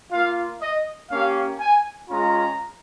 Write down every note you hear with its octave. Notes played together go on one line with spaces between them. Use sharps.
A#3 F4 F5
D#5
A#3 C#4 G4 F5
G#5
G#3 C#4 F4 A#5